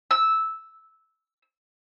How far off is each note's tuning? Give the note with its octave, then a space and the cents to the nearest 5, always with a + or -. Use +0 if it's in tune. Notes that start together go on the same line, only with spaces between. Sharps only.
E6 -10